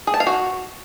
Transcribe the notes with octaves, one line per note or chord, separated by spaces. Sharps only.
G#4
A5
F5
F#4